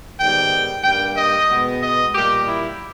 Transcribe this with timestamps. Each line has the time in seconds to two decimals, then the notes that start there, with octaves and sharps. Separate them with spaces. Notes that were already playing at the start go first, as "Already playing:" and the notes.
0.19 G#2 D#3 G3 B3 G5
0.84 G2 G3 A#3 G5
1.16 D#5
1.49 B2 G#3 B3
1.82 D#5
2.14 A#2 G3 A#3 G4
2.47 E4